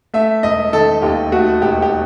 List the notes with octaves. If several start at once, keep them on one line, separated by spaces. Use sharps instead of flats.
A3 E5
E1 D#5
D#3 A4
D#2 G4
A3 F#4
E1 G4
G4